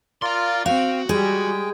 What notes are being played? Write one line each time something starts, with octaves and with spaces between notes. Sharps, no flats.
F4 A#4 D5 F5 C6
C4 F#4 F5 G5
G3 G#3 G#4 G5